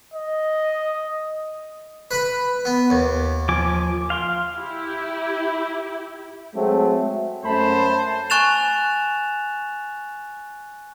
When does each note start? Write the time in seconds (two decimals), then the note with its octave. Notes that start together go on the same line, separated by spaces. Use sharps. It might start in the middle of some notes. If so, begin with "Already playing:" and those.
0.14 D#5
2.11 B4 B5
2.65 B3
2.90 D#2
3.49 F3 G#5 D6
4.10 F5 C6
4.56 E4 G4
6.55 F#3 G#3 A3 C4
7.45 F#2 A3 C5 A5 B5
8.30 G#5 C#6 F#6 A6 E7 F7